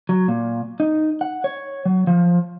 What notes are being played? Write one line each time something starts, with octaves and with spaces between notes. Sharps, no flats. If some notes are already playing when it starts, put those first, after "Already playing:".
F#3
A#2
D#4
F#5
C#5
F#3
F3